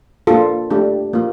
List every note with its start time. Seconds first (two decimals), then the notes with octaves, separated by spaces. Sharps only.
0.27 A#3 D4 F4 A4
0.70 A3 D4 G4 A4
1.13 A#3 F4